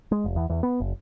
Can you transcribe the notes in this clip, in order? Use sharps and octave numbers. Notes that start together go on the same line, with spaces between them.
G#3
F1
E2
E2
B3
F#1